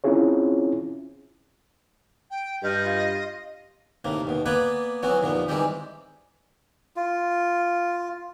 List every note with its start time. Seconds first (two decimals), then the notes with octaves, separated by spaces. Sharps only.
0.04 C4 C#4 E4 F4 G#4 C#5
2.31 G5
2.63 G2 D#5 F6 G6
2.84 F4
4.04 D#2 A2 C3 A#3
4.27 D#2 B2
4.46 A#3 B3 B4 D5 G#5 B5
5.03 E3 F#3 B3 C4 F#4
5.22 D#2 A#2 F3 B3
5.48 D#3 E3 G3 G#3 C4 G4
6.96 F4